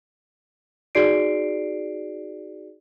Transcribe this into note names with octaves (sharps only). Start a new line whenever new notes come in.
D#4 F#4 G#4 D5 C7 D7